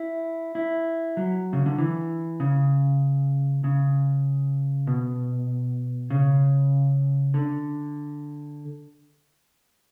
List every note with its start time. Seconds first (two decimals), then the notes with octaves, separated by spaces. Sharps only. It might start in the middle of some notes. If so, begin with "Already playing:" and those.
Already playing: E4
0.55 E4
1.17 F#3
1.53 C#3
1.66 D3
1.78 E3
2.40 C#3
3.64 C#3
4.87 B2
6.10 C#3
7.34 D3